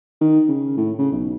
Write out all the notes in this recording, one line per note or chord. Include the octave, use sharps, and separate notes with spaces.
D#3
C#3
A2
C#3
B1